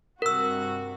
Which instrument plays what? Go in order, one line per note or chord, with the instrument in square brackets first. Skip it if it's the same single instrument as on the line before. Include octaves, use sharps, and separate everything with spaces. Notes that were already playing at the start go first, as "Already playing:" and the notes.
[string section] G2 C3 F#4 [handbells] A#4 E6